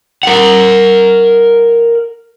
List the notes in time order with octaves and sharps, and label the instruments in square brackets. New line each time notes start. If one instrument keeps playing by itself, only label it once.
[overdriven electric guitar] A#4 F#5